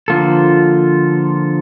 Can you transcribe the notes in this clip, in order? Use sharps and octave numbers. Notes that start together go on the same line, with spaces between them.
D3 F3 A#3 F4 A4